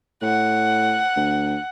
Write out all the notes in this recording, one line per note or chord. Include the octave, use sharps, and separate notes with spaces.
A2 F#5
D2